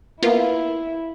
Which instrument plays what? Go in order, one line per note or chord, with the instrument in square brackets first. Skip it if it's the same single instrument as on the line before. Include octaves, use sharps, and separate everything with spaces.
[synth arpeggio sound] A#3 B3 F4 [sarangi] E4